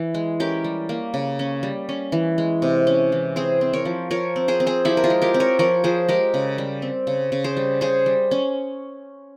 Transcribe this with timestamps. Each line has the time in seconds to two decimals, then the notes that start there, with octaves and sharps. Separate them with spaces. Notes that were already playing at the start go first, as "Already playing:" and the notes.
Already playing: E3
0.14 G#3
0.40 C#4 G4 A#4
0.64 G3
0.89 A#3
1.14 C#3
1.39 C#4
1.63 G3
1.89 C#4
2.12 E3
2.38 G#3
2.62 C3
2.87 C#4
3.12 E3
3.36 C4 G#4 C5
3.61 C4
3.73 A#4 C#5
3.85 F3
4.11 F3 A#4 C#5
4.36 C4
4.48 G#4 C5
4.60 C4
4.66 G#4 C5
4.85 F3 E4 G4
4.97 A#4
5.04 F4 G#4
5.10 G#3
5.22 G4 A#4
5.34 C4
5.40 A#4 C#5
5.59 F3 A#4 C#5
5.84 F3 G#4 C5
6.08 G#3 G4 A#4
6.34 C#3
6.58 G3
6.82 C4
7.07 C#3
7.32 C#3
7.44 G#4 C5
7.57 G3
7.81 C#3 G#4 C5
8.06 G3
8.31 C#4